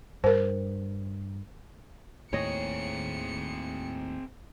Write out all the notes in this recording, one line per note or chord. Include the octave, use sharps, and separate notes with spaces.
G2 A#4 C5
D#2 A2 C4 G#4 C#5 D#5 C#7